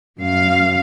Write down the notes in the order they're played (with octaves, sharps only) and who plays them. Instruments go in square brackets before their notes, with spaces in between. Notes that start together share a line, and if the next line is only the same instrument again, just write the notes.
[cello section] F#2 F5